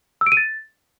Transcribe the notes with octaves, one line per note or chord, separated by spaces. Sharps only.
E6
D7
D#7
A6